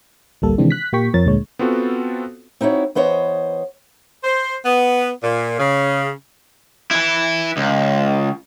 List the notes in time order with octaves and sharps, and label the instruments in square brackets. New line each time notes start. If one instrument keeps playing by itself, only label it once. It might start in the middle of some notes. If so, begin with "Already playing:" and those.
[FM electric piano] A1 D2 G3 A#3 A4
C3 D#3 E3 G#3 C4 D4
F#6 B6
A#2 A#3 G4 G5 C#6 B6
F2 F3 A#4 C#5 A6
D2 A#2 D3 G#3 C#5
[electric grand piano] B3 C4 F4 F#4 A4
[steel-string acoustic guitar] C4 D#4 E4 F#4 C#5
E3 B3 C5 C#5 D#5
[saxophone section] C5
B3
A#2
C#3
[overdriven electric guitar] E4 B4
C#2